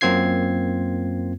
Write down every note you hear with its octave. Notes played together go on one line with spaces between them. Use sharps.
F#2 A#3 C4 F4 G#6 C7